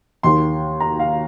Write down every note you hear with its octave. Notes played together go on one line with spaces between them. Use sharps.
D#2 D#3 C6
A#5
F5